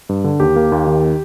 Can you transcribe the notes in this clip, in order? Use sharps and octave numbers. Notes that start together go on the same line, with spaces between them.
G2
D3
D#2 G4
A#3
D#2
D#3